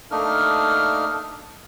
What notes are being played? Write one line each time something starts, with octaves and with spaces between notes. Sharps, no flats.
A3 A#3 D4 D#4 A#4 F6